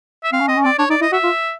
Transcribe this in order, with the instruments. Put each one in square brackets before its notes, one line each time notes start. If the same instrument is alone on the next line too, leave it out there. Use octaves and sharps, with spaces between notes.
[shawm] E5
[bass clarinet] C4 [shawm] F5
[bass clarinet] C#4
[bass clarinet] C4 [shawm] D#5
[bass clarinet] C#4
[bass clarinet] C4 [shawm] D5
[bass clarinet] D4 [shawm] C#5
[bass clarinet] D#4 [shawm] D5
[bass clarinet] E4 [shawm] D#5
[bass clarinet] F#4 [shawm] E5
[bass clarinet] F4